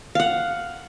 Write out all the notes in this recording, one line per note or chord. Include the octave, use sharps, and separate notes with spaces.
F5 F#5